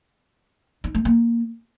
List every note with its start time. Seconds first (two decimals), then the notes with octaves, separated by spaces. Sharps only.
0.84 D#4
0.95 A3
1.05 A#3